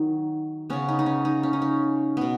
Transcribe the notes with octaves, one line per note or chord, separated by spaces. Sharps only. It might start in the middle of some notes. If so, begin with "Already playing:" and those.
Already playing: D#3 F#3 D#4
C#3 B3 C#4
D#4
D#4
C#4
D#4
C#4
D#4
C#4
B2 B3